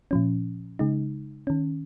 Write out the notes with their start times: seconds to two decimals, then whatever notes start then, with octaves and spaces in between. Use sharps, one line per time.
0.11 A#2 F3 C#4
0.79 C#3 G#3 D#4
1.47 D#3 C#4